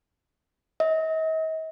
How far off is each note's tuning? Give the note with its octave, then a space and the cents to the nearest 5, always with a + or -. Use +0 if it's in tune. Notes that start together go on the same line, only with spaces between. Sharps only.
D#5 +45